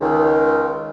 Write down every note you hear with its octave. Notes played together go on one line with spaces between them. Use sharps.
C#2 D#3